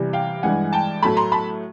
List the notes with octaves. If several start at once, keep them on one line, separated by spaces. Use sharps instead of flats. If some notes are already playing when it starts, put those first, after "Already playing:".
Already playing: C3 E3 G3
F5 G5
G2 E3 G#3 F#5 G#5
G5 A5
A2 F#3 A3 A5 B5
A#5 C6
A5 B5